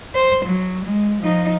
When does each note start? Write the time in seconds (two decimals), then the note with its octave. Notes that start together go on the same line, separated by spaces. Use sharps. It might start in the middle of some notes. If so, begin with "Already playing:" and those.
0.15 C5
0.45 F#3
0.85 G#3
1.21 F3 D#4